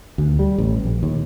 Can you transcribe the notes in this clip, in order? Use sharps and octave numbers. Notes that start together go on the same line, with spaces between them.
D2
G3
A1
A#1
D#2